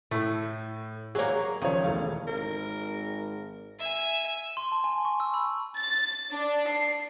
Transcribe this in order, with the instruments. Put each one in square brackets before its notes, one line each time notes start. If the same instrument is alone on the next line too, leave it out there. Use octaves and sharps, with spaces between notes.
[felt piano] A2 [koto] A3
[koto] F#3 A#3 [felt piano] G#4 C#5
[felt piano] C#2 F3 C#5 [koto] D#3
[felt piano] E1 A3 F5
[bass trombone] G#1 [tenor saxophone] A#4
[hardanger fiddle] E5 G#5
[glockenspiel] C6
A5
G#5
C#6
E6
B5
[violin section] A6
D4
C7